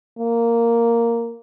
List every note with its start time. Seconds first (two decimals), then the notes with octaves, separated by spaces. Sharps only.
0.19 A#3